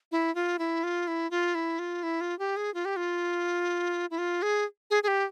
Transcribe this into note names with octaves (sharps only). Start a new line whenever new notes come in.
E4
F4
E4
F4
E4
F4
E4
F4
E4
F4
G4
G#4
F4
G4
F4
E4
F4
G#4
G#4
G#4
G4